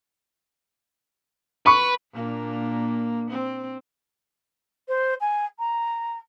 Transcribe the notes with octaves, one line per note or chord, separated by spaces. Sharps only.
B4 B5 C#6
A#2 A#3 D4
C4
C5
G#5
A#5